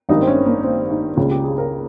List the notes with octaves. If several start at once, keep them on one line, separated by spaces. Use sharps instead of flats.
G#1 G2 D#3 D#4
C4
C#4
A#3
C4
D#4
C#2 C#3 F4
G4
G#4
A#4